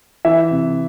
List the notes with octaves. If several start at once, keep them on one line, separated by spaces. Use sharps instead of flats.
E3 E5
C3